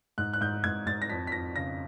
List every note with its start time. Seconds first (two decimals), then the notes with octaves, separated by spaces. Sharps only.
0.18 G#2 F#6
0.33 F#6
0.41 G#2 G6
0.64 G#2 G#6
0.86 G#2 A6
1.02 A#6
1.10 F2 B6
1.27 B6
1.32 F2 A#6
1.56 C#3 A#6